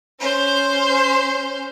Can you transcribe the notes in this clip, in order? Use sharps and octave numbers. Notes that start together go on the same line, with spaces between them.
C#4 C5